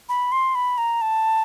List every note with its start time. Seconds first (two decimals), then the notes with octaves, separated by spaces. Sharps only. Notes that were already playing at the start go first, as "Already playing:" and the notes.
0.09 B5
0.32 C6
0.55 B5
0.78 A#5
1.01 A5